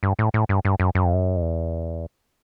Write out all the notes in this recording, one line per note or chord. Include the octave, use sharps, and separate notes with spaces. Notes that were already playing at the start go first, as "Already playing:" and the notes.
G2
A2
A2
G2
G2
F#2
F#2
F2
F#2
F2
E2